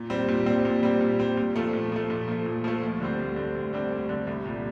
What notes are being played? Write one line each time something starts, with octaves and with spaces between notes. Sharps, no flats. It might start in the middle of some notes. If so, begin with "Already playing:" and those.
Already playing: A#2
G3 C4
A#2
G3 C4
A#2
G3 C4
A#2
G3 C4
A#2
F3 A3
A#2
F3 A3
A#2
F3 A3
A#2
F3 A3
D2
D3 G3 C4
D2
D3 G3 C4
D2
D3 G3 C4
D2
D3 G3 C4
C2
A#2 G3